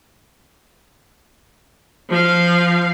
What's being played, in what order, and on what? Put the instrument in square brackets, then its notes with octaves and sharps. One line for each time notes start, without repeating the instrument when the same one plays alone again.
[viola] F3 F5